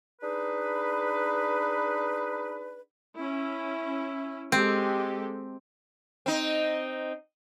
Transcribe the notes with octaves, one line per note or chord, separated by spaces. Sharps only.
D4 D#4 G#4 B4
C#4 E4
G#3 C4 G4 A4
C4 D#4